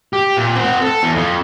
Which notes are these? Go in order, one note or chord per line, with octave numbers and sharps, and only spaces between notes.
G4
A#2
C4 F#5
A4
E2
F2